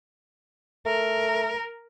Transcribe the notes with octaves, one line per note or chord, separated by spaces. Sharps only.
A3 A#4